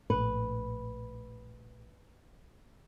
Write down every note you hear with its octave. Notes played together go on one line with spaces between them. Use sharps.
A#1 A2 B4